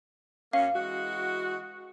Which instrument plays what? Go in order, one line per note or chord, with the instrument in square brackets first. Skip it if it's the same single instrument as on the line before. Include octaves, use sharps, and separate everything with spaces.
[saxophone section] F#2 A#3 C#4 [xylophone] F5
[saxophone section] E3 G#3 F#4